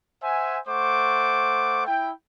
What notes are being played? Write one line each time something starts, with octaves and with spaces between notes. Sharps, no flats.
C5 E5 F#5 G#5
A3 C5 F#5 C#6 D6
E4 G5